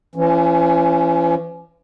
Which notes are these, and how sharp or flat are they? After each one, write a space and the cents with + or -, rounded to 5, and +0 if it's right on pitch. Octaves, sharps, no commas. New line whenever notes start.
E3 +45 C#4 +0